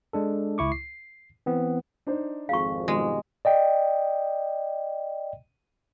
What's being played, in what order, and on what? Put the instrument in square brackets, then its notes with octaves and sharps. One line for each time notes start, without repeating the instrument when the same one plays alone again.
[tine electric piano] G#3 D4 A4
C#2 E4 C#6 D6
C7
E3 B3 C4
[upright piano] D4 D#4 C5
[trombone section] G#1 F2 [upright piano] F4 G#4 [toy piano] F5 C#6
[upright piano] B2 D#3 G3 [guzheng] G#3
[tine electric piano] D5 D#5 G5